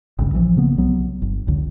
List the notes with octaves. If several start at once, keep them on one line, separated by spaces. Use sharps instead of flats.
G#1 D2 G2 C#3
A#1 E3 F3
C#3 A#3 B3
C2 F#3 B3
G1
F1 C#2 D3